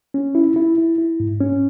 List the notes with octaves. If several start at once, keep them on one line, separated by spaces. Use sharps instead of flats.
C#4
E4
E4
E4
E4
G#2
C#4